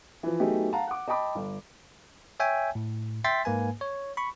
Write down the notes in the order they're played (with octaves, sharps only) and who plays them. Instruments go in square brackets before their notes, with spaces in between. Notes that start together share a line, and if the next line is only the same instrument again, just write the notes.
[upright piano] E3 F3
F#3 A3 B3 D#4 G4 G#4
F5 F#5 A5 A#5
F#5 D6
D#5 G5 A5 B5 D6
G1
[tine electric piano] C#5 E5 G5 G#5
A2
E5 G5 C6 A6 B6
G#2 A#3 B4 G#5
C#5
B5 C#6